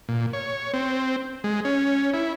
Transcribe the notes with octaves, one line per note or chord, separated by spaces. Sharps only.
A#2
C#5
C4
G#3
C#4
E4